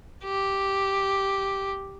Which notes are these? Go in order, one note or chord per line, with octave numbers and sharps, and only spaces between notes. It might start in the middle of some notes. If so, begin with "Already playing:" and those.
G4